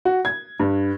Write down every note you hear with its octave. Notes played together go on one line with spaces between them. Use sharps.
F#4
G#6
G2